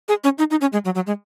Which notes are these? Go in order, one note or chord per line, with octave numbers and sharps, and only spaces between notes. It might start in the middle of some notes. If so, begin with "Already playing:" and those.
G#4
C#4
D#4
D#4
C#4
G#3
F#3
F#3
G#3